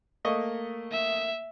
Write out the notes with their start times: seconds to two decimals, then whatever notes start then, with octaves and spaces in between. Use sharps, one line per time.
0.25 A3 A#3 D#5 C#6
0.92 E5